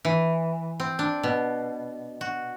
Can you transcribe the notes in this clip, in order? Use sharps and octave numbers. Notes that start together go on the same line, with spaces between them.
E3
C4
D4
B2
F#4